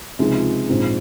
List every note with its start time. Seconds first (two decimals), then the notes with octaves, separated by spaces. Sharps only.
0.19 C#2 C3 F3 G#3 D#4
0.68 A#1 G#2 F3 C4 D#4